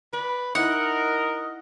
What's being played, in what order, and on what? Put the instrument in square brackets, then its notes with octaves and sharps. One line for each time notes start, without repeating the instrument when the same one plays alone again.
[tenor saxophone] B4 [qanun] D5
[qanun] D#4 E4 [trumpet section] A#4 [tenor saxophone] D#5 [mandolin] F#5